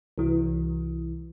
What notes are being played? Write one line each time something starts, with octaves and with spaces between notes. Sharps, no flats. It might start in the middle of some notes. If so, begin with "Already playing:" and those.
C2 E3